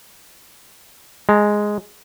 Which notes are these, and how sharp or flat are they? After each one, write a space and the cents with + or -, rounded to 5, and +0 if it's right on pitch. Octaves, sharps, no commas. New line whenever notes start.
G#3 +0 A#5 -25